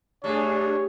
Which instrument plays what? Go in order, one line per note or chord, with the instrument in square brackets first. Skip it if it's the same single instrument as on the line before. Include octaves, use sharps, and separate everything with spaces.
[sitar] G3 [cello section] A3 G#4 [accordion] D4 [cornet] C#5